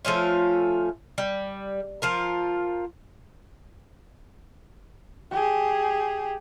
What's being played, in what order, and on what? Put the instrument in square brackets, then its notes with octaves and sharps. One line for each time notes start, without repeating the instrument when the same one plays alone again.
[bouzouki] F3 A3 C#4 F4
G3
F3 F4 A#4
[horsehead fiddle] G4 G#4